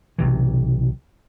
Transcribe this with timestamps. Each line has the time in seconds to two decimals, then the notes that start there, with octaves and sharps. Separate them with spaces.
0.18 B1 C3 E3